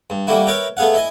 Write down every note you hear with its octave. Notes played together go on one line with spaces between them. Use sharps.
G2
G3 A3 A#3 E4 F#4
A#4 B4 C#5 E5 G5 A#5
A3 B3 G#4 F5 F#5
E4 D#5 G#5